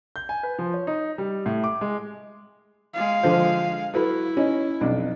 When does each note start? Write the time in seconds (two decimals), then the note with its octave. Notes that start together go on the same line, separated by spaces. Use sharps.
0.16 G6
0.29 G#5
0.43 B4
0.59 F3
0.74 C#5
0.87 D#4
1.18 G3
1.46 A2
1.64 D6
1.81 G#3
2.94 G#3 F5
3.23 D3 F3 C5
3.94 F#3 E4 A4 B4
4.37 C#4 D#4
4.81 B1 F2 D4